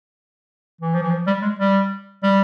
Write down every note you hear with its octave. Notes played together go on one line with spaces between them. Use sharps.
E3
F3
E3
F3
G3
G#3
G3
G3